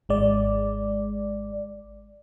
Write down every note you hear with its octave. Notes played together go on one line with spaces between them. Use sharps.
G#1 G#3 D5